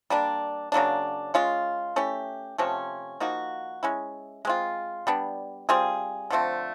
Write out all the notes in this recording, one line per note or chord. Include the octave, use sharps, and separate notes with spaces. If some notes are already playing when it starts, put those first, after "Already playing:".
G3 A#3 D4
C#3 F#3 A#3 D4
G#3 C#4 F4
A3 C#4 E4 G4
C3 F3 A3 C#4
F3 A#3 D#4 F#4
G#3 C#4 E4
G#3 C4 F4
G3 B3 D4
G3 C4 F4 G#4
D3 F3 A3 C4